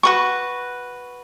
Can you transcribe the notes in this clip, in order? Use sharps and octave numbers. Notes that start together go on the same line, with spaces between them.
F#4 B4 C#6